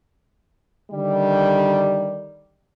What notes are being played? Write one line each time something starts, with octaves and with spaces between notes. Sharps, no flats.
D3 D#3 G3